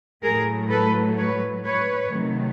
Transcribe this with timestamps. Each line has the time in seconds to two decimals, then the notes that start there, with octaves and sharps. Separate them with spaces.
0.23 A2 F#3 A3 G#4 A#4
0.71 A4 B4
1.17 B4 C#5
1.64 B4 C#5
2.12 C3 D#3 F#3 A3